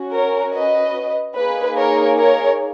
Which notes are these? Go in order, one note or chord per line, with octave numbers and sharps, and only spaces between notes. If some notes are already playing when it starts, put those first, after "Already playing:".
Already playing: C#4 F#4
A#4 C#5
B4 D#5
A#3 D#4 G#4 B4
A#4 C#5
A#4 C#5